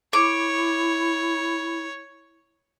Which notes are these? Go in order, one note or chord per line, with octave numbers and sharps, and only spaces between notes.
E4 C#5 D6